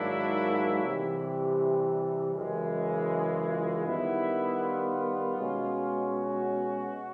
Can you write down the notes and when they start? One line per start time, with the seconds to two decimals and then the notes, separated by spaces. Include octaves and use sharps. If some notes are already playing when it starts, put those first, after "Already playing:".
Already playing: G#2 D#3 F#3 A#3 D4 E4
0.83 C3 E3 G3
2.35 F#2 C#3 E3 G#3
3.48 F4
3.86 D#3 G3 B3 E4
4.63 F4
5.38 B2 G#3 C#4
6.14 F#4